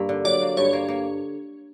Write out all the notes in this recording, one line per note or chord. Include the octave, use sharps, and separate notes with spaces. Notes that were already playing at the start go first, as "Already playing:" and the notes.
Already playing: G2 A#3
D3
F#3 D5
A#3
G2 C#5
A#3
A#3